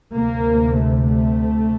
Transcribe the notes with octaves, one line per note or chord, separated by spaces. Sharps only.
D2 C3 A#3
A3
A3